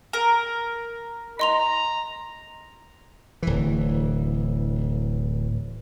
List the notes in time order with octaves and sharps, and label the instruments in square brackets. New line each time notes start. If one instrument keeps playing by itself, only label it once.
[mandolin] A#4
[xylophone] D#5 C6 F7 [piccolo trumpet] A#5
[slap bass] D1 E3